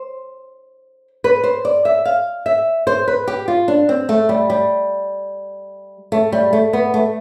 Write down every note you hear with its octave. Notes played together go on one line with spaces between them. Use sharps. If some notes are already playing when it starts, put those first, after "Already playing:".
Already playing: C5
B4
C5
D5
E5
F5
E5
C5
B4
G4
F4
D4
C4
A3
G3
G3
A3
G3
A3
B3
A3